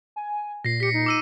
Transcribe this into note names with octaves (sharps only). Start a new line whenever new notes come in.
G#5
A#2 A#6 C7
G4 B6 C#7
D#4
D6 E6 D#7